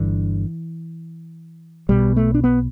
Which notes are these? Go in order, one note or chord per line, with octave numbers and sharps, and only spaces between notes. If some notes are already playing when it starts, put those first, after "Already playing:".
Already playing: G1 G2 D3 E3
B1 B2 G3
A3
D4
B3